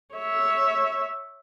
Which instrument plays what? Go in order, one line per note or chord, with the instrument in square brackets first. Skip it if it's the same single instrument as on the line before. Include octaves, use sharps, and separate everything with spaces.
[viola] C#5 E5